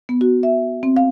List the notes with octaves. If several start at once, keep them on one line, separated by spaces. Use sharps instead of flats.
B3
F#4
E5
C4
F5